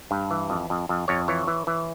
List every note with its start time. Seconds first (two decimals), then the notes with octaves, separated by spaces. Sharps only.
0.11 G2
0.31 E3
0.50 F2
0.70 F2
0.89 F2
1.08 F2 C#5
1.28 E3 C#5
1.47 E3
1.67 E3